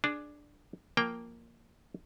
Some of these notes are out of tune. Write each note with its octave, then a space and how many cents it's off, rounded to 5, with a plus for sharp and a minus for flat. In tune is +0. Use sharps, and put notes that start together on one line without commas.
D4 +5 G#4 +15
F3 +0 A#3 -5 G5 +0